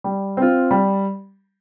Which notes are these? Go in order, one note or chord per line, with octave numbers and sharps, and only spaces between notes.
G3
C4 F4
G3